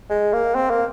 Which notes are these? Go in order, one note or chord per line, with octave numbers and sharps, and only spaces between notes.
G#3
A#3
C4
A#3